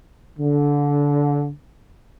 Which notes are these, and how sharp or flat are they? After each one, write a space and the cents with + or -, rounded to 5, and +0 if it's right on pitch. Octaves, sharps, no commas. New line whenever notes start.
D3 -20